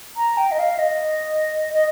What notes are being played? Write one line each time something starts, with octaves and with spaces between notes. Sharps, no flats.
A#5
G5
D#5
F5
D#5
D#5